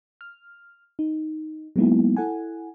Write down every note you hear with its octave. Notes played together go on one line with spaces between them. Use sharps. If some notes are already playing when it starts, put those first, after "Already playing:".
F6
D#4
F#3 G#3 A#3 B3 D#4 E4
E4 A4 F#5 G#5